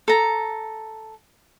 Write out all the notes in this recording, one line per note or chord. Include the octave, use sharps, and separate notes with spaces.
A4 A#5